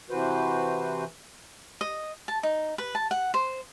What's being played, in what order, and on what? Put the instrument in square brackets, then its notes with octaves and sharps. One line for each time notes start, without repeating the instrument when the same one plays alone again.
[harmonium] C3 E3 F#4 B4 C5
[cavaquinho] D#5
A5
D#4
B4
A5
F#5
C5